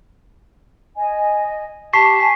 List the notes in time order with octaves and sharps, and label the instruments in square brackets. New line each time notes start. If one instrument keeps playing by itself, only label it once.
[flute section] D#5 G#5
[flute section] G4 [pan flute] A5 [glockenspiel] C#6 B6 C7
[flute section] G#5 [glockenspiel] B6